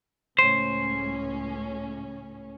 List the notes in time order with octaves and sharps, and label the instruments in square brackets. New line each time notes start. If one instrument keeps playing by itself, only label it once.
[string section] C#2 A2 C#4 [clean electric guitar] C5